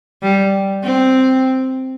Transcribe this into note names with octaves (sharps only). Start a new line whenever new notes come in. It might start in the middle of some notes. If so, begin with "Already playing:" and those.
G3
C4